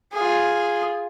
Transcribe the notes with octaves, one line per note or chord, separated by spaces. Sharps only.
F4 G#4